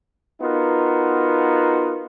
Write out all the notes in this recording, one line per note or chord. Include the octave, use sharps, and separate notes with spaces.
B3 D#4 F4 F#4 A#4